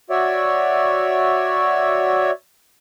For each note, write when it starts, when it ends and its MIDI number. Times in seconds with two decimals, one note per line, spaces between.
0.10 2.31 66
0.10 2.31 73
0.10 2.31 74
0.10 2.31 76